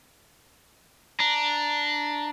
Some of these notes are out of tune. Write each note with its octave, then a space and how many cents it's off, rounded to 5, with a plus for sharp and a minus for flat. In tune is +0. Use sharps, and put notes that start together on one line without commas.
D4 +0 A#5 +0